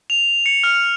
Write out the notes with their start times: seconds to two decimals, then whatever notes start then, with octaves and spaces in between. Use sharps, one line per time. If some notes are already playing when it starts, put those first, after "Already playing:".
0.10 F7
0.46 C#7
0.64 F6